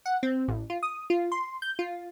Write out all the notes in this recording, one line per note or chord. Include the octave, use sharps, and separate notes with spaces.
F#5
C4
A1
F4
D#6
F4
C6
G6
F4